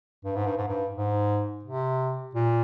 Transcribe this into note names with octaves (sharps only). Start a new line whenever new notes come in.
G2
G#2
G2
G#2
G2
G#2
C3
A#2